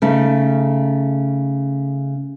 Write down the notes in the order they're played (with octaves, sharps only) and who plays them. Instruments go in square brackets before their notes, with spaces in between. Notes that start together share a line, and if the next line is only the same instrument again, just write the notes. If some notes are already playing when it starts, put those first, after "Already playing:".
[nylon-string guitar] C#3 A3 D#4